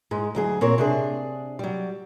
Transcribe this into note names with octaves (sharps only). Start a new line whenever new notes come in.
G#2 G#3
D2 F#3 G#4
A#2 C4 A#4 C#5
C3 D4 G#4
F#3 G3